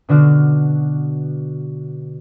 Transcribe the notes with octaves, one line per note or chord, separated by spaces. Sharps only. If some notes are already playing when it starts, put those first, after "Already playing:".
B2 D3 D4 F#4 F6